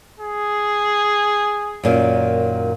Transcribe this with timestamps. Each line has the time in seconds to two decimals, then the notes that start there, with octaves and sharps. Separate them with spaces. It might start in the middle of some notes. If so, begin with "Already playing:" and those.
0.20 G#4
1.84 F#2 A#2 D#3